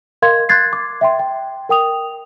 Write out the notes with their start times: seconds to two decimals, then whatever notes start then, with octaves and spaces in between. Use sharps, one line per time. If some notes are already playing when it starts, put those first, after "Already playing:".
0.22 A#4 D#5 F5 C6 G#6
0.49 C6 F#6 G#6 A6 C7
0.73 D6
1.01 E5 G5 C6
1.19 G5
1.69 A#4 G5 D#6 F7